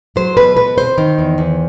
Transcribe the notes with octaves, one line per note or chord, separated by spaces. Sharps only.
F#3 C5
B2 B4
B2 B4
C4 C5
D#3
E2
E2